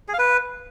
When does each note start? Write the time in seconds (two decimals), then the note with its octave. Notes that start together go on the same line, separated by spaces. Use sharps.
0.08 G#4
0.13 F5
0.19 B4